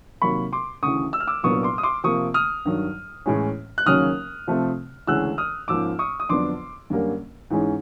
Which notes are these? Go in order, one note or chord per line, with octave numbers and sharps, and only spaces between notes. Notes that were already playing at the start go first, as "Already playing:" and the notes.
C3 D#3 F#3 A#3 B5 C#6
C6 D6
D2 C#3 E3 C#6 D#6
E6
F6
D6 E6
C2 A#2 F#3 B3 D4 C#6 D#6
C6 D6
D#6
C6 D6
C3 F3 A#3 C#6 D#6
D#6 F6
G2 D#3 F#3
A2 E3 G#3 C#4
F#6
D#2 C#3 F#3 A#3 C#4 D#6 F6
C3 F3 A3 C4
D2 C#3 E3 G#3 C#4 E6 F#6
D#6 F6
G#2 F3 A#3 C#4 D6 E6
C#6 D#6
D#6
F2 D3 F#3 B3 D4 C6 D6
F#2 D3 G3 A#3 C#4
G#2 E3 G#3 C#4